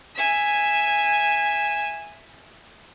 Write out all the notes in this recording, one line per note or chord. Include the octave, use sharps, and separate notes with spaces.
E5 G#5